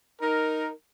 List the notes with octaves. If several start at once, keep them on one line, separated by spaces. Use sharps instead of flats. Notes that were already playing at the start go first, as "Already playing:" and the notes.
D#4 A#4